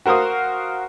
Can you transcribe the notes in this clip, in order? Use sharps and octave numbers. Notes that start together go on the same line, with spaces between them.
F#4 A#4 C5 F5 D#6